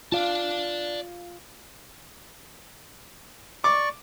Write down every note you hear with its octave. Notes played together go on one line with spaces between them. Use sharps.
F4 D5 F5 A5
D5 C#6 D6